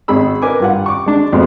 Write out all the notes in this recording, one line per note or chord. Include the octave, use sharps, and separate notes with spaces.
G#1 G#4 B5 E6
A#4 B4 G#5 D6
G2 F4 F#5
C#6 D6
G#3 D4
F2 B2 G#3 A3 C5 C6